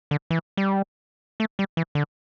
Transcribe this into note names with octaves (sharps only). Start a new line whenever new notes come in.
D3
E3
G3
A3
G3
E3
D3